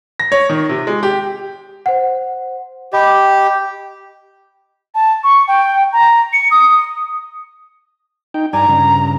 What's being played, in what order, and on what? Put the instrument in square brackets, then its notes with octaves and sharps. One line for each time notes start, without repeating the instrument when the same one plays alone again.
[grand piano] A#6
C#5
D#3
C3
G#3
G4
[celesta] C5 F#5
[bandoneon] G4 [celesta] D#5 B5 D6
[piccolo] A5
C#6
G5
A#5
C#7
D#6
[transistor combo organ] D#4 G5
[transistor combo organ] G2 D5 G#5 [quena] A#5
[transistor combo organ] G2 C#3